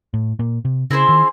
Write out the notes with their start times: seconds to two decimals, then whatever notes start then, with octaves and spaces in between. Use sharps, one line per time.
0.14 A2
0.39 A#2
0.65 C3
0.91 C#3 C4 E4 G#4 C5
1.09 D#3